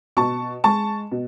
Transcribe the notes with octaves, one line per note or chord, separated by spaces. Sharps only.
B2 A5 C#6
G#3 A5 C#6
B2